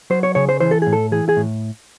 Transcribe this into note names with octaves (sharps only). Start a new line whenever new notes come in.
F#3 C5
C#5
C#3 C#5
C5
E3 C5
A4
A2 G#4
A4
E3 G#4
G#4
A2